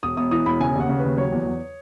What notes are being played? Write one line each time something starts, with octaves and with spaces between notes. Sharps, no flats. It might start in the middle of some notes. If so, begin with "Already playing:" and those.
E1 D#6
E1 D#6
E3 D#6
E1 B5
C#3 G#5
D#2 F#5
C#3
D#2 B4
F#3 C#5
E2
E2